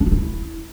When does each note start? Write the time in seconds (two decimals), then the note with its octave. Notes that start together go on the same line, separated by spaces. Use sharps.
0.01 D4
0.06 F4
0.12 E4